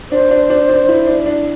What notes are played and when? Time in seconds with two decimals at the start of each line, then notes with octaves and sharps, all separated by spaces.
0.12 D4 C5
0.31 D4
0.50 D4
0.69 D4
0.88 E4
1.07 D4
1.26 D4